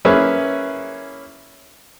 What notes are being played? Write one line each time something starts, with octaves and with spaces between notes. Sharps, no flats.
A#3 C#4 E4 G#4 B4 E5